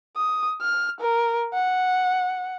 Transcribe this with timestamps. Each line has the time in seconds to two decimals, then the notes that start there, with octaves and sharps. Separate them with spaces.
0.17 D#6
0.62 F6
1.01 A#4
1.54 F#5